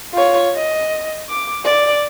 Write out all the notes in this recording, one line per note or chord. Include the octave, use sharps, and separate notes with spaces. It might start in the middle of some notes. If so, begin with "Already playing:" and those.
F4 C#5
D#5
D6
D5